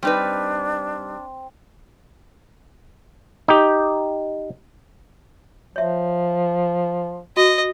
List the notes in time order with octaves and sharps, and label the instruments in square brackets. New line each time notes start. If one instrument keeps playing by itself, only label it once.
[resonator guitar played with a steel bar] G3 D#4 B4 [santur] C4 [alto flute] D4
[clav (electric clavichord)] D#4 G4
[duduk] F3 [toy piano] C#5 E5
[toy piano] F#4 [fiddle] D#5